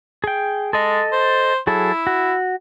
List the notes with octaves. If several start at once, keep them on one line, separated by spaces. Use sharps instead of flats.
G#4 G5
G#3 A4 D#5
C5
F#3 E4 G#4 A4
F#4